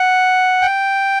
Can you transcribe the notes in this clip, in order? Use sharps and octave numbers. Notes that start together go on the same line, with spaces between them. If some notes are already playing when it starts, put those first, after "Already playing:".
Already playing: F#5
G5